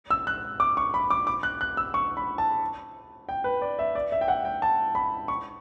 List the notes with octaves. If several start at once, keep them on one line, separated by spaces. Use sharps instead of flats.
E6
F#6
D6
C#6
B5
D6
D6
F#6
F#6
E6
C#6
B5
A5
G5
B4
D5
E5
D5
E5
G5
F#5
G5
A5
B5
C#6